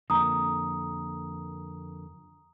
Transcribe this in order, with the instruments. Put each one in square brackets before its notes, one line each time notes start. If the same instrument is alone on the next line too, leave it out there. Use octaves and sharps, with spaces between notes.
[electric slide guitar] F2 D3 A#3 [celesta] A#5 D#6